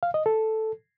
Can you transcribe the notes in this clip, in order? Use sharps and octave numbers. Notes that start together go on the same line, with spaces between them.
F5
D#5
A4